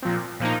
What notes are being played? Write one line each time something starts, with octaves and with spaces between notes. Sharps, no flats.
A#2 F3 C4
A#2 F3 A#3 D#4